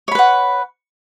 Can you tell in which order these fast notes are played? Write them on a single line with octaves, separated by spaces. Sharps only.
C#5 B5 B4 F#5